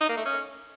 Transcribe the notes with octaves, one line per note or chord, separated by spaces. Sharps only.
D#4
A#3
A3
C#4